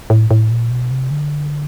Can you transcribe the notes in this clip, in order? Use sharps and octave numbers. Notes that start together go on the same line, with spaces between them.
A2
A2
A#2
B2
C3
D3